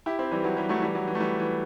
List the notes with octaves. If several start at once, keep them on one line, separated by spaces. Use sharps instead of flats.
E4 G4
C4 E4
E3 G3
F#3
E3 G3
F#3 A3
E3 G3
F#3
E3
A3
E3 G3
E3